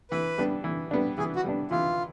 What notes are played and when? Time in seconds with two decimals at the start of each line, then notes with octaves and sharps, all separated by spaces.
0.11 E3 B4
0.38 G3 B3 D4
0.64 E3
0.91 G3 B3 D4
1.18 E3 G#4
1.36 F#4
1.44 G3 B3 D4
1.71 E3 F4